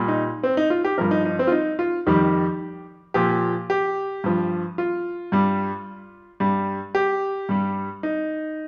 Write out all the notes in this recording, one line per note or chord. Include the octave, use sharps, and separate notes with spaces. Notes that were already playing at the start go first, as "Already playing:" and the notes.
Already playing: A#2 G3
D#4
C4
D#4
F4
G4
G2 F3 A#4
D#4
D#4
C4
F4
D#4
F4
F2 D#3 G3 G4
A#2 F3 G4
G4
G2 F3
F4
G2 G3
G2 G3
G4
G2 G3
D#4